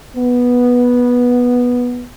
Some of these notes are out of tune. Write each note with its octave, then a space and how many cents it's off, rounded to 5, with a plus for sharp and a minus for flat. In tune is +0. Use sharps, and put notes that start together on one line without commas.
B3 -10